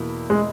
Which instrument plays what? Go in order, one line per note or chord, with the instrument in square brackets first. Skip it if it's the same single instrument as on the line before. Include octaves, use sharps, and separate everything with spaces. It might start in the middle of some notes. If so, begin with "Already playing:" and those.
Already playing: [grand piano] E2 B2 A#3 E4
[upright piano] G#3